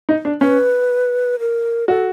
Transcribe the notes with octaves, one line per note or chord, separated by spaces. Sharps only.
D#4
D4
C#4 B4
A#4
F#4 A4